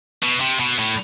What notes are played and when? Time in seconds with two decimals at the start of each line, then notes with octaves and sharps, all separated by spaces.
0.23 B2
0.40 C3
0.60 B2
0.79 A2